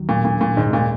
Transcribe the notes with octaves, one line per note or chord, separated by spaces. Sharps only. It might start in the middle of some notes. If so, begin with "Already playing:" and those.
Already playing: D#2 D#3 F#3
A#2
A#2
A#2
D#2 G#2 C#3 G#3
A#2